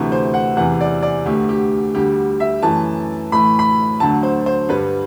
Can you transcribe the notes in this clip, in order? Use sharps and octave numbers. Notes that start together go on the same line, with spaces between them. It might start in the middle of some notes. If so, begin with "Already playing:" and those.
Already playing: D2 C3 E3 A3
C5
F#5
E2 C3 E3 F#5
D5
D5
D2 D3 A3 G4
G4
D2 D3 G3 G4
E5
F#2 E3 A3 A5
A2 E3 A3 B5
B5
D2 D3 F#3 A3 A5
C5
C5
G2 D3 G3 B4